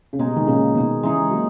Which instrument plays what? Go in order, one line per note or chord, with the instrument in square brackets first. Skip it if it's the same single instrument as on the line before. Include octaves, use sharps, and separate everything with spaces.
[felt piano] C#3
[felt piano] B2 [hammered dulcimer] G#3 D#4 G#4
[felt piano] D#3
A#2 C#3
B2 D#3
[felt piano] C#3 E3 [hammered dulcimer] G#3 D#4 G#4
[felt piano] F#3 A#3